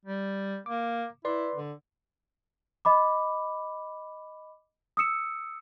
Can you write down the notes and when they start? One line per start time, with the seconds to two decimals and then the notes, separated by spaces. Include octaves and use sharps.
0.05 G3
0.66 A#3 D6
1.25 E4 B4 D5 C6
1.55 D3
2.85 D#5 B5 D6
4.97 D#6 E6 C#7 E7